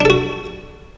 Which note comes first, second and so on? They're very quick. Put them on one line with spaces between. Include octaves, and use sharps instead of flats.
D4 A4 F#4